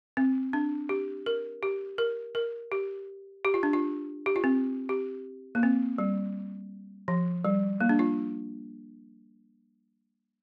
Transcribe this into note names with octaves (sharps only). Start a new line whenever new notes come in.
C4
D4
G4
A#4
G4
A#4
A#4
G4
G4
F4
D4
F4
G4
F4
C4
G4
A#3
C4
G3
F3
G3
A#3
D4
F4